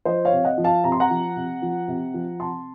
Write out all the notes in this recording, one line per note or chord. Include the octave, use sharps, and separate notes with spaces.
F3 C5 D#5
C#5 F5
C3
D#5 F#5
F3
F5 A5
C3 A#5
C6
F#5 A#5
F3
C3
F3
C3
F3
C3 A5 C6